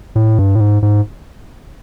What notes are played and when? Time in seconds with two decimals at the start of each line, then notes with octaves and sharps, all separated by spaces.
0.16 A2
0.39 G2
0.55 A2
0.60 G#2
0.83 G#2